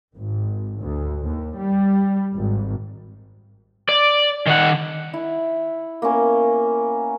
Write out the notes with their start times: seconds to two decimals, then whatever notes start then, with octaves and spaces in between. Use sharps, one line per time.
0.17 G#1
0.80 D2
1.25 D#2
1.58 G3
2.35 G#1
3.89 D5
4.46 D#3 F#5
5.14 E4
6.02 A#3 B3 C#4